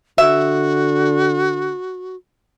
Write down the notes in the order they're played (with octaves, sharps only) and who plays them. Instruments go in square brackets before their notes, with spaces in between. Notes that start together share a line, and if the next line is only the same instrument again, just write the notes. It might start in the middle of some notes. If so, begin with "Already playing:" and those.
[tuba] D3 [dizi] F#4 [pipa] E5